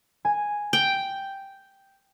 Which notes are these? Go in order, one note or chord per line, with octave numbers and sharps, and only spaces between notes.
G#5
G5